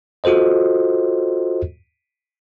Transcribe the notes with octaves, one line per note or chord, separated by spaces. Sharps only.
F4 F#4 A4 C5 D#5